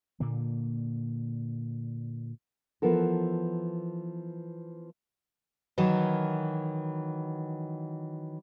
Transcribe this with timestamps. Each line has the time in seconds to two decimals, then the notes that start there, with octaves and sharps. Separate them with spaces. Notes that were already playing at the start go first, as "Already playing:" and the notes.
0.20 A#2 D3 A#3
2.82 E3 F3 B3 A4 A#4
5.78 D#3 E3 F#3